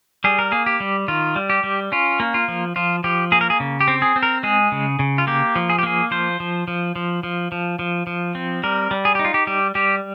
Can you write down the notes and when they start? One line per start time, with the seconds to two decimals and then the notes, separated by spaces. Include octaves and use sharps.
0.24 G3 G#4
0.39 A#4
0.52 A#3 G#4
0.66 G4
0.80 G3
1.08 D#3 F4
1.36 G3
1.50 G4
1.64 G3
1.92 C#4 F4
2.20 A#3
2.34 F4
2.48 F3
2.76 F3 F4
3.04 F3 G4
3.32 A#3 G#4
3.41 A#4
3.50 G#4
3.60 C#3
3.81 G4
3.88 C4
4.02 G#4
4.16 C4
4.23 A#4
4.43 G#3 G#4
4.72 C#3
4.99 C#3
5.18 F4
5.27 A#3 G4
5.55 F3
5.69 G#4
5.79 G4
5.83 A#3 G#4
6.11 F3 C5
6.40 F3
6.68 F3
6.96 F3
7.23 F3
7.52 F3
7.79 F3
8.07 F3
8.35 C4
8.63 G3 A#4
8.91 G3
9.05 G#4
9.15 D#4 G4
9.25 F4
9.34 G4
9.47 G3 G4
9.75 G3 G4